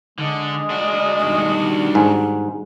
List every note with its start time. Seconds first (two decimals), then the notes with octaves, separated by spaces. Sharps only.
0.18 D3 G#3
0.70 D4 F#4
1.22 G2 B2 D#3
1.95 G#2